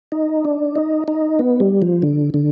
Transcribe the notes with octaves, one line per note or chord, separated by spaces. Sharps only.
D#4
D4
D#4
D#4
B3
G3
F3
D3
D3